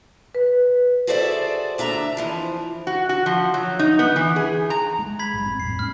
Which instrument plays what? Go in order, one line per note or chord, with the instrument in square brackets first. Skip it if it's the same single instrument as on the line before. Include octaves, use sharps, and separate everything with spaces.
[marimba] B4
[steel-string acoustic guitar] F#4 G#4 A4 C5 D5 E5
D2 D4 E5 A#5
F2 E3 F3
[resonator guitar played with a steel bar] F#4
F#4
F3
F#3
D#4
B3
E3
G#4
A#5
[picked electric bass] G#3
[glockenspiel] B5 G#6 B6
[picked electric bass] G#1 G#2 G3
C4
[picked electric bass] F2 A2 [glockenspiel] C7
[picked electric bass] G#3 C#4 [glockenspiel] F6